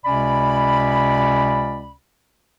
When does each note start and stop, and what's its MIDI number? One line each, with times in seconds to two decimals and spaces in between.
0.05 1.92 37
0.05 1.92 48
0.05 1.92 61
0.05 1.92 74
0.05 1.92 83